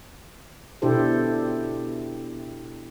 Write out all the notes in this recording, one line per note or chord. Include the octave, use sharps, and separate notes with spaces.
B2 D4 E4 G4 A4 C5